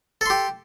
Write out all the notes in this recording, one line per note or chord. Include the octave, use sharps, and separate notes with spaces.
G4 A4 C6